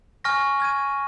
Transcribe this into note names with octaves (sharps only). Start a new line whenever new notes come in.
G#5 C#6 F6 A#6
F6 G#6 D#7